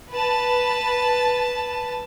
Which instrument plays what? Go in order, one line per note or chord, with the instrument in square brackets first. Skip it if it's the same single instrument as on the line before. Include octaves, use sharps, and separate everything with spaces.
[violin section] B4 A5